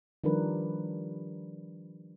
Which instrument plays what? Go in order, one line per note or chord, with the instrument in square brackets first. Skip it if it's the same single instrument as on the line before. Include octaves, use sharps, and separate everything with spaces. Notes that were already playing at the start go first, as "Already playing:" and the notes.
[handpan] D#3 F3 G3 D4 A#4 B4